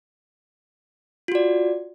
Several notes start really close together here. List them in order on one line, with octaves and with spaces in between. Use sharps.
F4 F#4 D5